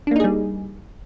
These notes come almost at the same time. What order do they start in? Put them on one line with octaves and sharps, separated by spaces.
D4 A#3 D#4 G#4 G3